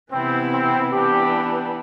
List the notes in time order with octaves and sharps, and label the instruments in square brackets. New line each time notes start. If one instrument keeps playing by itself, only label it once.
[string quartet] C3 E3 B3 E4 [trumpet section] C4
[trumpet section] C4
[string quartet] E3 B3 D4 [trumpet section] G4